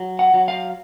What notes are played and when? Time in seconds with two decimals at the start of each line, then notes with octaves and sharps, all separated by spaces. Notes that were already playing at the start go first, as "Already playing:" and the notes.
Already playing: F#3
0.19 F#5
0.34 F#3
0.48 F5